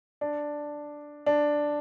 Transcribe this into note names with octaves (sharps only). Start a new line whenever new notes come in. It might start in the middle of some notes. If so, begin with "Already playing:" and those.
D4
D4